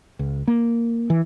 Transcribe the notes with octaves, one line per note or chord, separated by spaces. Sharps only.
C#2
A#3
E3